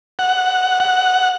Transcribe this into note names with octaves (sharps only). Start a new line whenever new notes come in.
F#5
F#5